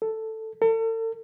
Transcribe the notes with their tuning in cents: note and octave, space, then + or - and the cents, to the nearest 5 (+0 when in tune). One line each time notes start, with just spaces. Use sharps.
A4 +5
A4 +40